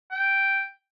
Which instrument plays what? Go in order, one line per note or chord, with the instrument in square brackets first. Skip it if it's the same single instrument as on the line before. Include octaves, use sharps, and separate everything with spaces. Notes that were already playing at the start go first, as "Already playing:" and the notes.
[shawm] G5